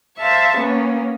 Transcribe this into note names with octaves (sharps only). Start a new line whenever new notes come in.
C5 E5 F5 A5 C#6
A#3 B3 C#4